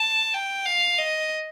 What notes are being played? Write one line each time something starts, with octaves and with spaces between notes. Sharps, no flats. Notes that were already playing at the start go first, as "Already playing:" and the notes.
Already playing: A5
G5
F5
D#5